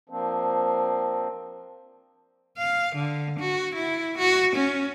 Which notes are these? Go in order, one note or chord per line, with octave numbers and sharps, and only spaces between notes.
F3 A#3 C4 D4
F5
D3
F#4
E4
F#4
C#4